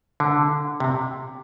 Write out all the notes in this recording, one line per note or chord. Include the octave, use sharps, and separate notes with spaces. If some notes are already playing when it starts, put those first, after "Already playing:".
D3
C3